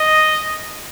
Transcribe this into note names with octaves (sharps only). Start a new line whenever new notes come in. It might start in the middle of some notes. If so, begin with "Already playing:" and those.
Already playing: D#5